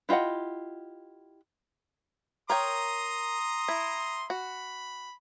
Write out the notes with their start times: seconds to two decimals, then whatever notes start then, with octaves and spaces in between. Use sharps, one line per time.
0.09 E4 F4 G4 D#5 F#5
2.50 A#4 C#5 G5 A#5 C6 D#6
3.69 E4
4.30 F#4 B5